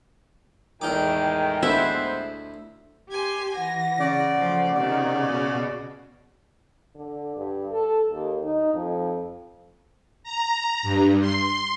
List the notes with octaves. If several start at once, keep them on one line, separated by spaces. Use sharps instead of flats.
E2 A2 D#3 G#3 D#4 G5 D6
D2 B3 E4 C5 E5
G4 G#5 C6
E3 F#5 A#6
C#3 D5
F3 A3
C3 D#3 D5
B2 F#4
D3
G2
A4
D#2
D#4
F2
A#5
G2
C6